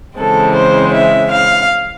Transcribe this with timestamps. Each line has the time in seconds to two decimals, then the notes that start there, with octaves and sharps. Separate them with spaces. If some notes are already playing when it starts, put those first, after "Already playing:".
0.19 C#3 E3 G#3 C4 A4
0.56 C5
0.93 E5
1.31 F5